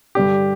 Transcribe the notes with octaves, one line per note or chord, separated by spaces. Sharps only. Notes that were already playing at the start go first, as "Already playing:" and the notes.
G2 D3 G3 D4 G4